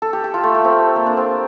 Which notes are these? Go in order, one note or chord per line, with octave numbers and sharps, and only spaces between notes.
A4
G4
G4
F4
A3
A3
C4
A#3
D4
C4